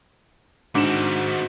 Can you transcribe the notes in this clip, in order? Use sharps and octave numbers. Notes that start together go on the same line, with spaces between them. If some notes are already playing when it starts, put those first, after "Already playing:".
G#2 C4 D4 F#4 D6 E7